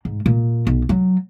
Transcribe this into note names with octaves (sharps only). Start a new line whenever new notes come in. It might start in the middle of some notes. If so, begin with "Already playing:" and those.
G#2
A#2
B1
F#3